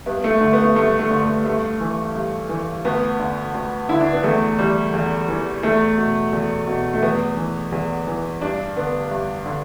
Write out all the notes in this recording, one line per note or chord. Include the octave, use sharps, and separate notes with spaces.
G2 B3
A3
D3 A3
B3
A3
G2 A3
A3
D3
A3
G2 A3
E3
G2
E3
D2 B3
D3
D2
D3 E4
D4
B3
E2 A3
E3 G3
E2
E3
E2 A3
B2
E2
B2
A3
E2 B3
E3
E2
E3
G2 D4
D3 B3
G2
D3